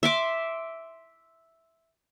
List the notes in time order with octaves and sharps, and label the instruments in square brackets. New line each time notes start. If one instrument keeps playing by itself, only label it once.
[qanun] E5 C6 D6